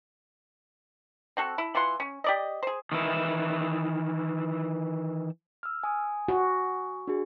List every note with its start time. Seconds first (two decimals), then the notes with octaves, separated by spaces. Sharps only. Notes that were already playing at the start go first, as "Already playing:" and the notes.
1.37 C4 F#4 A4
1.58 E4
1.75 E3 F4 F#5 C6
2.00 C#4
2.24 G4 D5 D#5
2.63 G#4 C5
2.92 D#3 E3 E4
5.63 E6 F6
5.83 G#5 D#6
6.28 F#4
7.07 D4 F#4 G#4